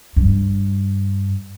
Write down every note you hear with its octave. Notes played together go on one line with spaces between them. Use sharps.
G2